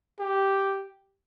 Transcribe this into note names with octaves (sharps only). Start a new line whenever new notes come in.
G4